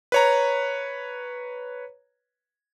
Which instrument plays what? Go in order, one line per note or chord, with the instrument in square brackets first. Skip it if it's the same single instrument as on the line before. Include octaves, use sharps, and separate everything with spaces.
[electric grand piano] B4 C#5 A#5